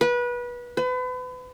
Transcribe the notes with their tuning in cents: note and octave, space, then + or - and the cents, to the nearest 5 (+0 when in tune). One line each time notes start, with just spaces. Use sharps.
B4 -25
B4 +35